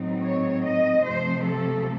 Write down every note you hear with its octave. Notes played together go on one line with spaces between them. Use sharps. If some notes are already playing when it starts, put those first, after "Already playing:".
Already playing: A2 F#3 C4 D#4
C#5
D#5
C3 F3 A3 C5
A4